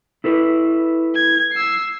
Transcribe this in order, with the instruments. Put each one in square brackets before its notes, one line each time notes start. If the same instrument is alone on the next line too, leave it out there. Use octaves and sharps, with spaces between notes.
[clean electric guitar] E4 A4 B4
[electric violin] G#6
E6 C7